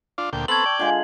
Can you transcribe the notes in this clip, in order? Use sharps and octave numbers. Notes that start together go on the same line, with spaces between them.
D4 F4
D2 A#2 G5
B3 C4 A4 A5 C#6 E6 G#6 F#7
D5 G5
D3 G#3 F4 F5 G#5